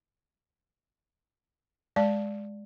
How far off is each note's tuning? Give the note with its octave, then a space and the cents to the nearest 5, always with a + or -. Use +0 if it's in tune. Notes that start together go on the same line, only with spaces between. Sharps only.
G#3 +0 D5 +0 A5 +0